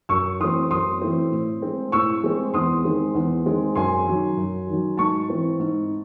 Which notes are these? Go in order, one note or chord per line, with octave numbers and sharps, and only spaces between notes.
F#2 C#6 E6
E3 A3 C4 C6 D#6
F#2 C6 D#6
E3 A3 C4
A2
G#3 C4
A2 C#6 E6
G#3 C4
E2 C6 D#6
D#3 G#3 C4
E2
D#3 G#3 C4
F#2 G#5 C6
D#3 F#3
F#2
D#3
F#3
G#2 A5 C#6
E3 C4
G#2